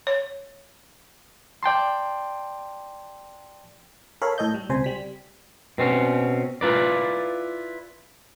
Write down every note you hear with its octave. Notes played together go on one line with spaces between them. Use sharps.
C#5
D5 G5 A5 C6
A4 A#4 C#5 F5 B5
A2 A4 D#5 G6
G3
C#2 C3 C5 G#5
G3 B6
B2 C4 C#4
E4 F4 B4 D5